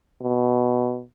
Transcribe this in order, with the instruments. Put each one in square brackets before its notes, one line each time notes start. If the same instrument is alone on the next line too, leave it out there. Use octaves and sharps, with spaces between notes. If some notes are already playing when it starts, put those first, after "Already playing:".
[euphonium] B2